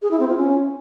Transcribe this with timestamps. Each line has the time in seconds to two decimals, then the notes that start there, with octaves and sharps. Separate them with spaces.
0.02 G#4
0.11 E4
0.20 C4
0.29 F4
0.37 C#4